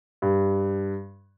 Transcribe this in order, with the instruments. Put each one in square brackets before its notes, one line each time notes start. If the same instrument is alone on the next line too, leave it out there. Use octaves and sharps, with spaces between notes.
[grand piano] G2